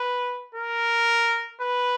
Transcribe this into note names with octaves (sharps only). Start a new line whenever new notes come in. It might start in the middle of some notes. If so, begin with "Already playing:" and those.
Already playing: B4
A#4
B4